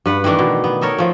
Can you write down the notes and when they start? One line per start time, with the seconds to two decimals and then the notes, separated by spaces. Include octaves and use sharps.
0.05 G2 B4 F#5
0.24 D#3 E3 A3 D4
0.39 B2
0.64 B3
0.81 D#4 A4 A#4 C#5
0.98 F3 A3